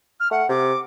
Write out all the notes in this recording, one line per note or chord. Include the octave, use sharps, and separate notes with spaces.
F6
A3 F#5
C3 D6